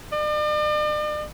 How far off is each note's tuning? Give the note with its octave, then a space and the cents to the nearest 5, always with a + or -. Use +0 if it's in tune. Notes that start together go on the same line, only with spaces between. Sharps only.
D5 +45